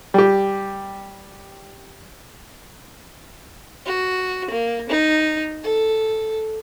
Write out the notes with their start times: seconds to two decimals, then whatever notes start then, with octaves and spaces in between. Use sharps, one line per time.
0.14 G3 G4
3.86 F#4
4.50 A#3
4.89 D#4
5.63 A4